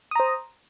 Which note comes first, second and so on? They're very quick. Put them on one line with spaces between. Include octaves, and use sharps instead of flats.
D#6 A#5 C5